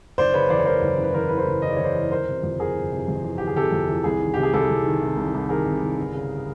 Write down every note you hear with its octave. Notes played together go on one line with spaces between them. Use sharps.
F#1 C5 D5
C#3 B4 C#5
E2 C5 D5
C#5
E3 A#4 C5
F#1
C#3
B4
E2 A#4 C5
E3 B4
A#4 C5
F#1
C#3 D#5
D5
E2 C#5
C5 D5
E3
G1 A#4 C5
C3
F2
E3 G#4 A#4
G1
C3
F2
E3
G1 G4
G#4
C3 G4 A4
F2
E3
C2 G#4
D#3
C3 G4
G#4
C2 G4 A4
C2
D#3
C3
C2
C2
D#3 G#4 A#4
C3
C2
G1
C#3